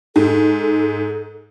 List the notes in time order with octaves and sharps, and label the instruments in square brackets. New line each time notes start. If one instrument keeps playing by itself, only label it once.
[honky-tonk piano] G#2 [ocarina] A4